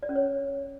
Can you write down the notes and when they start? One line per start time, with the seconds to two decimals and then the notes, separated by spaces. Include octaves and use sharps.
0.03 D5
0.09 C#4
0.16 C#5